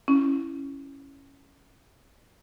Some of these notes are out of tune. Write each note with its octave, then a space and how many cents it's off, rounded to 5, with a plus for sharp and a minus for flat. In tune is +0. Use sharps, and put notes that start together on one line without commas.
C#4 -5 E4 +5